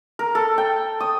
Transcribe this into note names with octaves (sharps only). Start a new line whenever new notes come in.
A#4
A4
G5
D#6